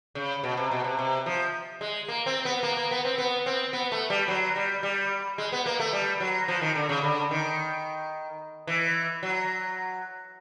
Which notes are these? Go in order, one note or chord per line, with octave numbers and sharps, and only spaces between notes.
C#3
B2
C3
B2
C3
C3
F3
G#3
A#3
C4
B3
A#3
A#3
B3
C4
B3
C4
B3
A3
G3
F#3
G3
G3
G#3
B3
A#3
A3
G3
F#3
F3
D#3
D3
C#3
D3
D#3
E3
F#3